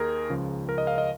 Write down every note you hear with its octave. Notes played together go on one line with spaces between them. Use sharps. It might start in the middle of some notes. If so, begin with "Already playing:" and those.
Already playing: D#2 D#3 G#4 A#4
C#2 C#3 F3
A#4
D#5
F5
D#5